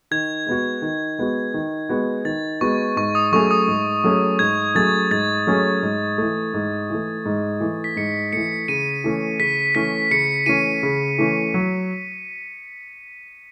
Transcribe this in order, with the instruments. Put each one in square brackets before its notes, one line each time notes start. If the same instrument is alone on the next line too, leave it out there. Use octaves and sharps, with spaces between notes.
[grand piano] D#3 [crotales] G#6
[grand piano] G#3 B3 F#4
D#3
G#3 B3 F#4
D#3
G#3 B3 F#4
[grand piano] D#3 [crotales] A6
[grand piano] G#3 B3 F#4 [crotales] C#6
[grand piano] G#2 [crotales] C#6
[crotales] D#6
[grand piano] F#3 A3 C#4 G#4 [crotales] C#6
[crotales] D#6
[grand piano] G#2
F#3 A3 C#4 G#4
[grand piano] G#2 [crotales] G#6
[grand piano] F#3 A3 C#4 G#4 [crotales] A6
[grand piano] G#2 [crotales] A6
[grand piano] F#3 A3 C#4 G#4
G#2
E3 A3
G#2
E3 A3
G#2
E3 A3
[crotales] B6
[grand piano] G#2 [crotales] C#7
[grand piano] E3 A3 [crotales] C#7
[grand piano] C#3 [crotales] D#7
[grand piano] E3 A3 C#4
[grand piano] C#3 [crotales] B6
[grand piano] E3 A3 C#4 [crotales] B6
[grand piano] C#3 [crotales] C#7
[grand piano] E3 A3 C#4 [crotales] D#7
[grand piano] C#3
E3 A3 C#4
F#3